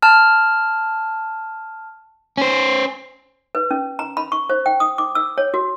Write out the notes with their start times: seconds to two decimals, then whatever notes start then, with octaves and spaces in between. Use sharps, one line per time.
0.02 A5 F6
2.38 C#4 C5
3.55 B4
3.71 C#4
3.99 A#5
4.17 B5
4.32 C#6
4.50 C5
4.66 G5
4.80 D#6
4.98 D6
5.15 E6
5.38 C#5
5.54 F#4